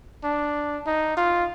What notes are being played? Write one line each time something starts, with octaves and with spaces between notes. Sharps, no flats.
D4
D#4
F4